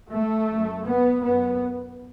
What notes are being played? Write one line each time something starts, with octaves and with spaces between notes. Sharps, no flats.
A3
F#2
B3
F#2 B3